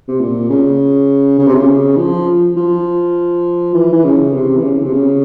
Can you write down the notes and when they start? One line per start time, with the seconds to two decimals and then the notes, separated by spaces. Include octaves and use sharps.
0.08 C3
0.20 A#2
0.50 C#3
1.38 C#3
1.47 C3
1.54 C#3
1.97 F3
2.57 F3
3.74 E3
3.92 E3
4.04 C#3
4.34 C3
4.56 E3
4.63 C#3
4.83 C3
4.93 C#3